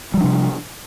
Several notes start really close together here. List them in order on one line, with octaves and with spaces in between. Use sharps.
G3 F3 D4 C3